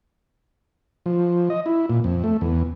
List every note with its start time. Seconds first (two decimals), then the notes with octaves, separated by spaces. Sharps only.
1.06 F3
1.50 D#5
1.66 E4
1.90 A#2
2.04 F2
2.24 A3
2.41 E2